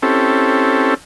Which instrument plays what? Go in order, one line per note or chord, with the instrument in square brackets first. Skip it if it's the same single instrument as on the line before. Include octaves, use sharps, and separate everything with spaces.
[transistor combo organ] C4 C#4 E4 G4 A4